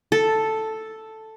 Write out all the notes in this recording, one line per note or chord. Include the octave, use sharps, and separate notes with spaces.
A4